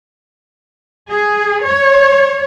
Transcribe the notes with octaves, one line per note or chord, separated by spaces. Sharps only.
G#4
C#5